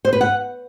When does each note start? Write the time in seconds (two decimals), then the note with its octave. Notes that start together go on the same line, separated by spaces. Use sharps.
0.05 C5
0.13 B4
0.21 F#5